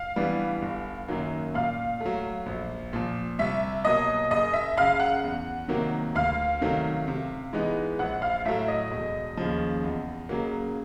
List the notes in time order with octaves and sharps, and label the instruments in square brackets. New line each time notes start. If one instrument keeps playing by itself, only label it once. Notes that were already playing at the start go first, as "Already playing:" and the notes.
Already playing: [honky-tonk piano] F5
[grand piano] E3 G3 B3 D4
G1
F#2 D#3 F#3 A#3
[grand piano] A#2 [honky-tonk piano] F5
[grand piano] A3
F#3
A#1
A#2 F3
[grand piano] C2 [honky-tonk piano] E5
[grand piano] B2 F#3 A#3 [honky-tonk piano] D#5
[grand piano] F#1 [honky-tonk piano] D#5
[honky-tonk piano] E5
[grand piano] F#2 C#3 [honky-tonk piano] F5
[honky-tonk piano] F#5
[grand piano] E2
C3 D#3 F#3 A#3
[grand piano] D2 [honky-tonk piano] F5
[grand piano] C3 D#3 F#3 A3
C3
E3 G#3 B3 D#4
[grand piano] A#1 [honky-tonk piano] F#5
[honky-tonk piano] F5
[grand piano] A2 F#3 A3 [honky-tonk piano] E5
[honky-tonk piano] D#5
[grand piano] E1
D#2 C#3 F3
E2
C#3 F#3 A#3